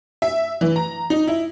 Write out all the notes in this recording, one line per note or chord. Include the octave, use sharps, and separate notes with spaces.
E5
E3
A#5
D#4
E4